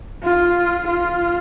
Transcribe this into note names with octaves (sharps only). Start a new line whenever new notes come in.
F4
F4